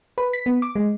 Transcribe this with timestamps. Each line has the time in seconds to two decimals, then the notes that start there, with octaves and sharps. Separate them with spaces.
0.18 B4
0.33 B6
0.46 B3
0.62 D6
0.75 G#3